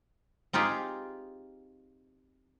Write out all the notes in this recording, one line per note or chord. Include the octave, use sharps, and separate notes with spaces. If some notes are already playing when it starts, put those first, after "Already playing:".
C4 D#4 F4 G4 G#4